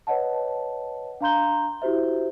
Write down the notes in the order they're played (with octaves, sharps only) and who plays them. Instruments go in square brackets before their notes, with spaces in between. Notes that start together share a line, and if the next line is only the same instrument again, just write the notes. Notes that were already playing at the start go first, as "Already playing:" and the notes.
[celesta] B4 C#5 D#5 F#5 A5
D4 F5 A#5 C6 G6 G7
E4 F#4 G4 C5 E5